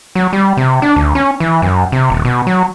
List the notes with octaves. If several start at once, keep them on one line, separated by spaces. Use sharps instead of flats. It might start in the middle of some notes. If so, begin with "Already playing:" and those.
F#3
G3
C3
D4
D2
C#4
E3
F#2
C3
D#1
B2
F#3